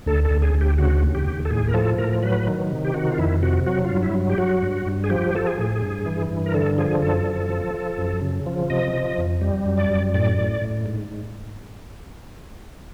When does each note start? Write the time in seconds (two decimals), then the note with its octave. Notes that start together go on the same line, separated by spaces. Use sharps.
0.06 D2 A4
0.25 A4
0.31 D2
0.42 G#4
0.54 D2
0.61 G4
0.78 C#3 F#4
1.03 D#2
1.15 G4
1.27 D#2
1.45 A4
1.50 A2 G#4
1.68 A#4
1.74 F3 A4
1.98 A2 A#4
2.22 F#3 B4
2.47 D#3
2.71 C3
2.85 G4
2.94 D#3 F#4
3.12 F4
3.18 F2 E4
3.42 C3 F#4
3.66 F#3 F#4
3.85 F4
3.90 G2
4.03 E4
4.14 F#3
4.30 G4
4.38 F#3 F#4
4.62 G2
4.86 G2
5.04 G#4
5.10 F3 G4
5.35 F3 A4
5.47 G#4
5.59 A2
5.82 G2
6.06 E3
6.31 G2
6.46 A#4
6.54 D3 A4
6.78 F3 G#4
7.02 F#2 A4
7.26 F3
7.50 F3
7.74 F3
7.98 F#2
8.22 C#3
8.46 F3
8.70 C3 D#5
8.93 F3
9.18 F2
9.41 G3
9.66 F#2
9.77 D5
9.90 F#2
10.14 A2 D5
10.38 A2
10.61 A2
10.86 G#2